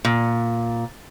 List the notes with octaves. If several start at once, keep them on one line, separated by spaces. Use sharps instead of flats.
A#2